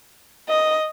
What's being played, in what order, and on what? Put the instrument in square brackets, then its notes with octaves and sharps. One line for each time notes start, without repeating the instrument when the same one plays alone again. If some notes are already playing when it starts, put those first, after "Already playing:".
[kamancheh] D#5